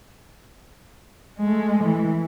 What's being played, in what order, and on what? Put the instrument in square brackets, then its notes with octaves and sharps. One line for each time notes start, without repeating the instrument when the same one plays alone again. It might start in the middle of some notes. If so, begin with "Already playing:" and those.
[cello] G#3 A3
E3